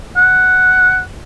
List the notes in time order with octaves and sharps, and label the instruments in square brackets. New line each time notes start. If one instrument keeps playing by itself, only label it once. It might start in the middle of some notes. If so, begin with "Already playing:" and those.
[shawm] F#5